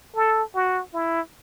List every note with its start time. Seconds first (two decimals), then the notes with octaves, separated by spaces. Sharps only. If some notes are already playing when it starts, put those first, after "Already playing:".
0.16 A4
0.55 F#4
0.93 E4